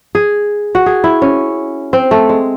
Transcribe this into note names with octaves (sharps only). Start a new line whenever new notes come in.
G#4
F#4
G#4
E4
C#4
C4
A3
G#3